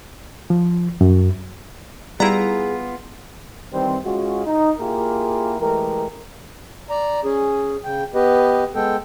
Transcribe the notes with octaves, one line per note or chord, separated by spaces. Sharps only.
F3
F#2
G3 B3 E4 F4 G#4 A#5
D#3 E3 G3 C4
G#3 C#4 F4 F#4
D#4
A#3 E4 F4 G4 G#4 A#4
E3 G#3 A3 G4 A#4
D5 A#5
C#4 G#4
C#3 G5
B3 G4 B4 D#5
G#3 B3 A4 G5